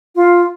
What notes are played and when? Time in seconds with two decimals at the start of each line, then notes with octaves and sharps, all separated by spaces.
0.16 F4